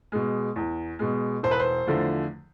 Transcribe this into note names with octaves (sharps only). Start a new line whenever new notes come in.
B2 G#3
E2
B2 G#3
E1 C5
B4
C5
E2 D3 F3 A3